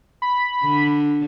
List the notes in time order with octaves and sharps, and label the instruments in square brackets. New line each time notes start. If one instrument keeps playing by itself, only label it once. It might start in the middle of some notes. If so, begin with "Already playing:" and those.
[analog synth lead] B5
[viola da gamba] D3